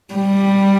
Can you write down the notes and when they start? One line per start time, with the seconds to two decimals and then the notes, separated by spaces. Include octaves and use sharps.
0.15 G3